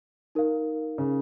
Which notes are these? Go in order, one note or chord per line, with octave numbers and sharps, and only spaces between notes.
D#4 A#4 F5
C#3